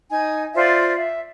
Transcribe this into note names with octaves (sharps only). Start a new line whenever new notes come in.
D#4 G#5
F4 C5 D5 E5
E5